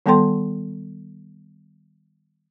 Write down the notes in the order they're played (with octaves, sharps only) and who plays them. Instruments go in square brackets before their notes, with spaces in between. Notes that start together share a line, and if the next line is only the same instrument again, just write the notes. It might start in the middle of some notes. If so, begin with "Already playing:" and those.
[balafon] D#3 G3 B3 A4 G5 C6